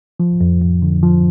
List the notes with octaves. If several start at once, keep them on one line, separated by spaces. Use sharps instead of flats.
F3
F2
F2
D3
F3